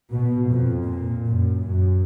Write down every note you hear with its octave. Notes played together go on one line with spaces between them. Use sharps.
B2
F2
A#2
F#2
F#2